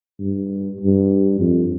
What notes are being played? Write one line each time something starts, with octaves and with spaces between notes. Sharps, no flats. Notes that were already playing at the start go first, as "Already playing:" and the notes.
G2
G2
F2